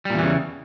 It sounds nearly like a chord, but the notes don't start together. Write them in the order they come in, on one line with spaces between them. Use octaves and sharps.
G3 A#2 E2 E3 C#3